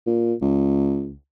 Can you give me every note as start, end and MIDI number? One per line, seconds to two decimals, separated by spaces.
0.07 0.34 46
0.41 1.13 37